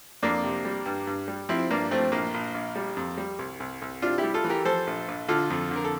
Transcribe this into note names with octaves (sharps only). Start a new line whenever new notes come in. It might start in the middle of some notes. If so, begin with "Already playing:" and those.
F2 A#3 D4
C3
G3
G2
G2
G3
F3 C4 E4
G2 A#3 D4
F3 A3 C4
A#1 A#3
A#1
A#1
G3
F2
G3
C2
C2
C2
C3 D4 F4
E4 G4
G3
F4 A4
E3
G4 A#4
F3 A4 C5
A#1
A#1
D3 F4 A4
F2
D3
A#4
A4